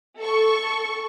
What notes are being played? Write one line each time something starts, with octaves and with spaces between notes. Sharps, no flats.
A4 C#6